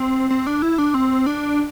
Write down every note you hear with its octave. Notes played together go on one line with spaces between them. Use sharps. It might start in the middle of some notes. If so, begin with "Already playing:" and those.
Already playing: C4
C4
D4
E4
D4
C4
D4